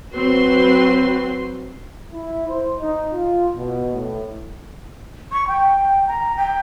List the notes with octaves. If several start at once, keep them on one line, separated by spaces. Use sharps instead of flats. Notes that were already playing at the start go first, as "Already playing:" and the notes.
F#3 C4 F#4 B4 C6
E4
C5
D#4
F4
B2
A2
C#6
G5
A#5
G5